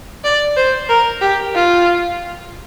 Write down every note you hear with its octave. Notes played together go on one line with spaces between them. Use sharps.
D5
C5
A#4
G4
F4